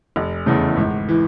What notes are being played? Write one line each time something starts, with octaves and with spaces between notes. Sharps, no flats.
F1
E2 C#3 E3 A3
G#1
E3